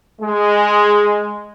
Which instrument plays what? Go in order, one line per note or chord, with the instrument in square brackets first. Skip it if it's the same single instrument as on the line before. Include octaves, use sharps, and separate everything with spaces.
[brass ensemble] G#3